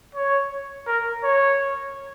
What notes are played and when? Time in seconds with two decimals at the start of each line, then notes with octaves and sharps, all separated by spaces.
0.15 C#5
0.87 A#4
1.24 C#5